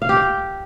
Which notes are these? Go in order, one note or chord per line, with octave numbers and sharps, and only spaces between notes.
F5
G4
G5